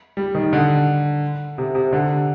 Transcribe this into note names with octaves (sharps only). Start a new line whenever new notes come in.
G3
D#3
D3
C3
C3
D3